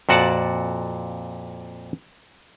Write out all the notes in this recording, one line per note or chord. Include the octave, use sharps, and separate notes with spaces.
F2 A#2 F#4 D5 F#5 A5